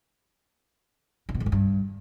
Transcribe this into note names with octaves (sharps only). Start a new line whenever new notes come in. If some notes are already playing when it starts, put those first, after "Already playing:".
D3
B2
G#2
B2
G2